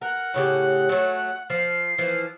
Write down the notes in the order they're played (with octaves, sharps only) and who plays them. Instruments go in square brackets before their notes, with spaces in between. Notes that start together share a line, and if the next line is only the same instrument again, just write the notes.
[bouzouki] A#4 [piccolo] F#5
[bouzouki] A2 C#3 G4
F#3 A3
[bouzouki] F3 [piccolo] C7
[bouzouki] E3 F3